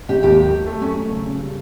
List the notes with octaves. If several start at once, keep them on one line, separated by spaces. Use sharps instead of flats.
G#1 G4
D#2 G4
F#3
A3
A3
F#2 C#4
F#3
C#3
C#3
G3